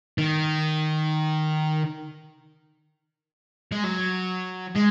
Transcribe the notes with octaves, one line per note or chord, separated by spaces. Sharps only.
D#3
G#3
F#3
G#3